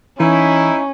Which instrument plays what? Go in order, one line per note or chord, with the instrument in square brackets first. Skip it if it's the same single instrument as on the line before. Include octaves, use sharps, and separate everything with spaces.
[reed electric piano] E3 [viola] C#4 [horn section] D#4 E4